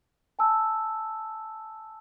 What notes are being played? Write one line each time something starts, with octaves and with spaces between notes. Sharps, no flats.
G#5 A5 E6